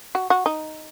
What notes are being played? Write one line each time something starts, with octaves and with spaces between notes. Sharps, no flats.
F#4
F#4
D#4